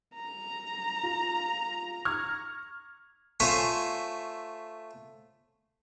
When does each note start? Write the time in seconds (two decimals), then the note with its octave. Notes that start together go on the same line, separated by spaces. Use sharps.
0.16 A#5
1.03 F4
2.05 C#6 F6 G#6
3.40 A3 F4 C5 C#5 E5 G#5